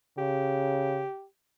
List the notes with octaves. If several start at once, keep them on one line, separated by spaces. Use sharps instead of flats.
C#3 G4